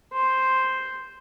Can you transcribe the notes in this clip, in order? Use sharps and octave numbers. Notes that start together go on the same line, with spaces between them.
C5